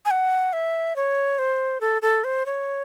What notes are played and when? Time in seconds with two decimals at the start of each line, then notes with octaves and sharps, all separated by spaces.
0.05 G#5
0.11 F#5
0.53 E5
0.96 C#5
1.39 C5
1.81 A4
2.02 A4
2.24 C5
2.46 C#5